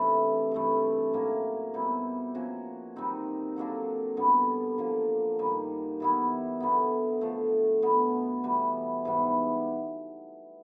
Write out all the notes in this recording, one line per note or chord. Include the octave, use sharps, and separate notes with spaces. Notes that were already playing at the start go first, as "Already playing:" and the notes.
Already playing: C3 E3 A3 D4
G2 E3 A3
A2 F#3 A#3 C#4
B2 G3 C4 E4
F3 A#3 C#4 F#4
D#3 G3 C4 D#4
D3 F#3 A#3 D4
G2 D3 G3 B3
D3 F3 A#3
G2 D#3 G3
E3 G3 B3 E4
D3 F#3 B3
D3 F3 A3
B2 F#3 B3
E3 G3 B3
G#2 E3 G3 B3